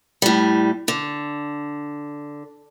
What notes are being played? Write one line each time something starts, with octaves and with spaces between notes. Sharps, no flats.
A2 G3
D3